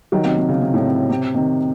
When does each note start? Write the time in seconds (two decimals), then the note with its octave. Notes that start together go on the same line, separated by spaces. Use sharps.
0.12 D#3 F#3
0.25 C3 D#3
0.37 C3
0.49 C#3
0.61 C3
0.74 A2
0.85 C3
1.10 C3
1.34 C3 D#3